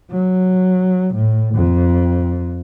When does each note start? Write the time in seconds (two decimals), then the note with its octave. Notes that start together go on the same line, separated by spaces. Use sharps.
0.11 F#3
1.15 A2
1.54 F2